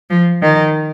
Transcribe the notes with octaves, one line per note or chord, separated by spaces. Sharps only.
F3
D#3